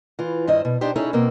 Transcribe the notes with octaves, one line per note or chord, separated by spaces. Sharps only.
E3 F4
G2 D#3 E4 C5 D#5
B2
D4 D#4 G4 C5
C#4 D#4 E4 G#4 A4 C#5
B2 A#3 C4